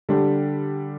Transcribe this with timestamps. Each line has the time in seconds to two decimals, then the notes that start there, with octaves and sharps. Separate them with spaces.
0.09 D3 G3 D4 G4